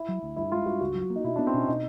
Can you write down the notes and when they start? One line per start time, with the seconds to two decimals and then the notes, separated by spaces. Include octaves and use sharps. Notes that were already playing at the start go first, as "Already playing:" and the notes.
Already playing: E4
0.08 F#3
0.23 D2
0.36 G2 E4
0.52 G#3 F4
0.66 G2 F#4
0.81 C#2 F#4
0.95 F#3
1.10 A#3
1.16 D#4
1.24 B2 E4
1.36 B3 D4
1.47 C4
1.54 B2 C#4
1.68 B2 D#4